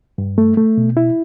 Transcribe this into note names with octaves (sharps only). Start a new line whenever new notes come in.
G2
A3
A3
B2
E4